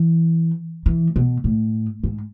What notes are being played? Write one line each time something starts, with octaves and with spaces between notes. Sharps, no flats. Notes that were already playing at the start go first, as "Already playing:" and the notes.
Already playing: E3
E3
B2
A2
G#2